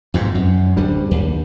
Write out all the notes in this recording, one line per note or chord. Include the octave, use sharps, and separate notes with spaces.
F2 G#2 B2
F#2
D1 G3 D4
D#2